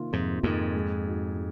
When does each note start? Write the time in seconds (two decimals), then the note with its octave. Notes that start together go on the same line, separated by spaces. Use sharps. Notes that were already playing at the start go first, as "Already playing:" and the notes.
Already playing: C3 D#3 A#3 F4
0.12 F2 G#2 C3
0.43 F2 G#2 D#3 A#3 F4
0.75 G#3
1.06 D#4 F#4
1.36 G#3